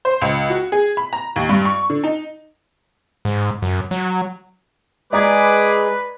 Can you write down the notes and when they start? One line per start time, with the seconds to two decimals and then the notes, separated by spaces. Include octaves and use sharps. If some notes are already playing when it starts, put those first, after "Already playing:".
0.05 C5
0.22 C#2
0.50 F#4
0.72 G#4
0.97 B5
1.13 A#5
1.36 D#2
1.49 G2
1.65 C#6
1.90 D3
2.04 D#4
3.25 G#2
3.62 F#2
3.91 F#3
5.13 G#3 G#4 B4 D5 A#5 D6 G#6